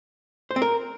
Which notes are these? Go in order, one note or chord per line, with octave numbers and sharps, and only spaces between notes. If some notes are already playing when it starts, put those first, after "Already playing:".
C5
C4
A#4